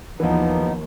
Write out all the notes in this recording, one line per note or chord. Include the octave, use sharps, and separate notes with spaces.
D#2 E3 F3 B3 D#4